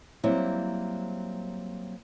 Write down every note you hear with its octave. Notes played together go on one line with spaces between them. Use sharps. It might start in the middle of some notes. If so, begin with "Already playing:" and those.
F#3 G3 A#3 C4 E4